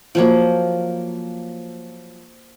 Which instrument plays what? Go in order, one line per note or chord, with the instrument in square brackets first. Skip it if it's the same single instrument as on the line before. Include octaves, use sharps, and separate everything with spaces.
[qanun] F3 F#3 A#3